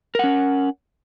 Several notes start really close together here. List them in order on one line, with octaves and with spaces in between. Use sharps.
A#4 F#5 C#4